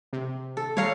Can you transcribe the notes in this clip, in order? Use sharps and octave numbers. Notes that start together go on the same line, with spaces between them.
C3
A4
G3 C#5 F5 A#5